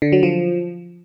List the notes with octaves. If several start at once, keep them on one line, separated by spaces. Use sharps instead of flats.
D3
F#3
F3